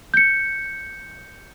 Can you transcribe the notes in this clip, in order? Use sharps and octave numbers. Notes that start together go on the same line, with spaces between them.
G6 C#7